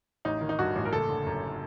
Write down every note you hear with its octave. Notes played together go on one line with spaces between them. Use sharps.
A1 D#4
D#3
D#4
G2 F#4
A1
A#4
F#1 A4
D3
F#2